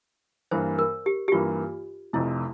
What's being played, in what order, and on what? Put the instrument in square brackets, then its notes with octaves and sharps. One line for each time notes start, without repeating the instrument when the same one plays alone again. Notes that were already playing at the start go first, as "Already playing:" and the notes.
[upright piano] G2 E3 A#3 [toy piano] C5
[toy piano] A#4
G4
G4
[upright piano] G2 E3 A#3 [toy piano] F4
[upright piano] F1 F2 C3 [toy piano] E4